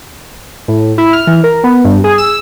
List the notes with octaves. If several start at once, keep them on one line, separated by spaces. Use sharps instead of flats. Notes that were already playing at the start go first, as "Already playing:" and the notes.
A2
E4
F6
E3
A#4
B3
G2
G#4
E6